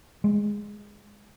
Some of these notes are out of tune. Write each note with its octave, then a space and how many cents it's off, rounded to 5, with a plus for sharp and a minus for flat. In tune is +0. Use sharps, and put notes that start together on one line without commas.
G#3 -5